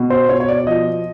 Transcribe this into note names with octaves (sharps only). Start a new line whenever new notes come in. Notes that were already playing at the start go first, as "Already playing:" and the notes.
Already playing: B2
C5
B2 C#5
C#5
D5
D5
F3 D#5